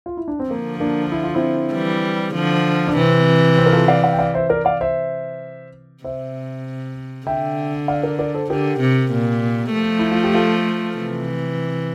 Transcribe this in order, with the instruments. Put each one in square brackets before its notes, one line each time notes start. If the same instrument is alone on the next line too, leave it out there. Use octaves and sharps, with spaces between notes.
[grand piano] F4
E4
D4
C4
[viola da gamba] D3 F3 [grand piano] A#3
[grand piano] A#3 D4
E4
F4
C4 E4
[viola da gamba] E3 G3
D3 F3
[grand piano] D4
[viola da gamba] C3 E3 [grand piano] C4
[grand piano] C4
A#4
F4 A4
D5 F5
D5 F5
G5
D5 F5
C5 E5
A#4 D5
D5 F5
C5 E5
[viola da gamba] C3 [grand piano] C5 E5
[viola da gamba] D3 [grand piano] E5 G5
[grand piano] D5 F5
A#4 D5
A#4 D5
A4 C5
[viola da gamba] D3 [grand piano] G4 A#4
[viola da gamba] C3
A#2
F3 A3
[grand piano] E4
F4
G4
F4 A4
[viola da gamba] C3 E3